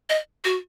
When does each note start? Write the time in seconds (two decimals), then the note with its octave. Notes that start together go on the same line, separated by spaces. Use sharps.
0.09 D#5
0.44 F#4